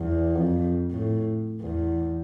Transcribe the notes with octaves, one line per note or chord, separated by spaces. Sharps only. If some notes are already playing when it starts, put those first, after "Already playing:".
Already playing: E2
F2
A2
E2